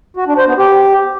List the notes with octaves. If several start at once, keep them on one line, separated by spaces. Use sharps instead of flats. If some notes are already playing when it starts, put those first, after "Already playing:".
F#4
D4
C5
B3
G4